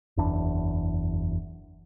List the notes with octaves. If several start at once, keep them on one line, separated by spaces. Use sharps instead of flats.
F#1 E2 D4